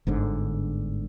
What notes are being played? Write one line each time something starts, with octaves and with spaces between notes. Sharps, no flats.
G1 G#2 D3